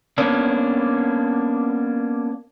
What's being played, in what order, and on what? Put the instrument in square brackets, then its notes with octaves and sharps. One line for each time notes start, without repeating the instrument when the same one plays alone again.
[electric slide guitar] A#3 B3 C#4 D4